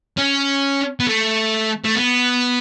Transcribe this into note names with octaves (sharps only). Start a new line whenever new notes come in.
C#4
B3
A3
A3
B3